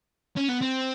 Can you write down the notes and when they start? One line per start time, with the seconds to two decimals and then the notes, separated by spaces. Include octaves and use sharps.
0.36 C#4
0.48 B3
0.61 C4